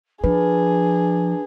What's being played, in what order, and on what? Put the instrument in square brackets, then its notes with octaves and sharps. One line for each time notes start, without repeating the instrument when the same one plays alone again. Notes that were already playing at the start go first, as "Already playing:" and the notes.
[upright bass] F3 [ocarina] D4 [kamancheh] G#4 [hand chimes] B4